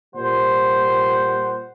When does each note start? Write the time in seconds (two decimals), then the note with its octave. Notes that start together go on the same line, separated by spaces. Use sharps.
0.15 A#2 G3 C5 F#5